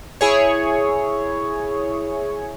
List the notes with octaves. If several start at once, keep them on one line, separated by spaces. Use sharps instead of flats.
E4 G#4 C#5